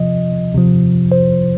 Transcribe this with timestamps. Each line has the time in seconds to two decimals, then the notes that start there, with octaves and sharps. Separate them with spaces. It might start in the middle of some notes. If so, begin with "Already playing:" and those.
Already playing: C3 F3 D#5
0.54 C3 F3
1.12 C5